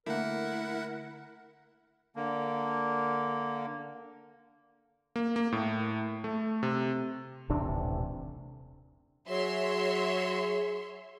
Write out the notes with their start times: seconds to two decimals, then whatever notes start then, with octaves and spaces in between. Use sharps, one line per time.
0.06 D3 A3 A#3 E4 A#4 F#5
2.16 D3 A#3
5.16 A#3
5.36 A#3
5.52 A2
6.24 A3
6.63 C3
7.49 D#1 A1 C3 D4
9.28 F#3 G#4 C#5 E5 C6